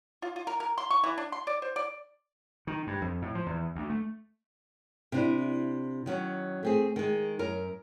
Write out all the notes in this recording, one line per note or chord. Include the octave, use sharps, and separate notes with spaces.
F4
F4
A#4
A#4
C6
C#6
E3
D4
C6
D5
C5
D5
D#3
G2
F2
A2
F3
E2
D2
A3
C3 D4 E4
D#3 F#3 C#4
A3 C4 G#4
D#3 G#3
F#2 A#4